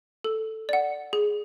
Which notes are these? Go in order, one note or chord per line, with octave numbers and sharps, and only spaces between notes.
A4
D5 F#5
G#4